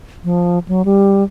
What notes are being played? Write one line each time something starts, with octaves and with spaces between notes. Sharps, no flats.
F3
F#3
G3